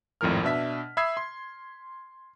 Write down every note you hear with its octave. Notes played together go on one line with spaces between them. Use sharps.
G#1 F2 A2 F3 A#4 F6
B2 D4 E5 B6
E5 B5 D#6 E6 G#6 C7
C6